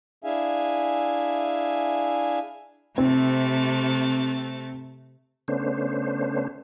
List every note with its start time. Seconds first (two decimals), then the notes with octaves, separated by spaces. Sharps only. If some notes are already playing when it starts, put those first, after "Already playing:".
0.24 D4 E4 G#4 E5 F5 G#5
2.98 C3 A3 C4 A6
5.48 C#3 A3 B3 C#4 D4 C5